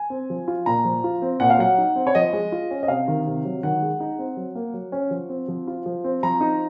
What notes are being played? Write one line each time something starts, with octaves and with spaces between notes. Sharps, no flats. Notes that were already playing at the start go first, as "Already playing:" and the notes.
Already playing: G#5
C4
F3
F4
A#2 A#5
F3
F4
C4
A#2 F#5
F5
F#3 F#5
D#4
C4
C#5
F3 D#5
G#3
F4
C#4
D#5
C3 F5
D#3
C3
F#3
D#3 F#5
G#3
D#4
C4
F#3
A#3
F#3
C#4
F3
C4
F3
F4
F3
C4
F3 A#5
D#4